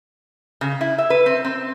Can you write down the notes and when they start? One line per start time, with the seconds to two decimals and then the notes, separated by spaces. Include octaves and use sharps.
0.61 C#3
0.81 E4
0.98 E5
1.10 B4
1.26 C4
1.45 C4